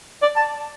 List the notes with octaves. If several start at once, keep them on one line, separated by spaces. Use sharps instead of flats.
D5
A5